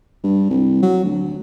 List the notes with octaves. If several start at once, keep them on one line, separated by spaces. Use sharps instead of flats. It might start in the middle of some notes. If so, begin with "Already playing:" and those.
G2
C2
F#3
D2